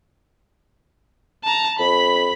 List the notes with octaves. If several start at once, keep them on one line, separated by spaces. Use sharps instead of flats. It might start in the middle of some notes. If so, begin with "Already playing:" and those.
A5 A#5
F2 B5